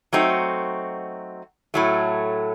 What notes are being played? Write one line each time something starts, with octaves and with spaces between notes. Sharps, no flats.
F#3 A3 C4 D#4 F#4
A2 F#3 A3